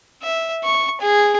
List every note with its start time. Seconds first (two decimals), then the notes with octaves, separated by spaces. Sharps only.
0.23 E5
0.64 C#6
1.01 G#4